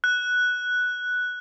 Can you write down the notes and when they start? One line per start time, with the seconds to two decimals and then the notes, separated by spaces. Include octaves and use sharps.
0.04 F#6